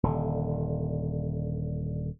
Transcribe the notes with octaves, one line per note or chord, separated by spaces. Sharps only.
D#1 D3